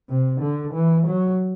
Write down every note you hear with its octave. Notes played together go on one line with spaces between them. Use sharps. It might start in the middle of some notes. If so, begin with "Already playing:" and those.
C3
D3
E3
F#3